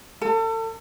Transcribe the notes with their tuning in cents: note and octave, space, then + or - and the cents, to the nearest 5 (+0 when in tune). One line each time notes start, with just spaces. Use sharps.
A4 +35